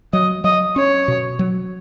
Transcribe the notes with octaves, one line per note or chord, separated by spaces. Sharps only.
F#3 D#5
F#3 D#5
C#4 C#5
B2
F#3